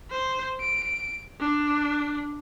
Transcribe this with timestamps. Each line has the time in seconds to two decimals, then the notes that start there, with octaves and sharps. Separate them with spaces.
0.11 C5
0.60 D7
1.40 D4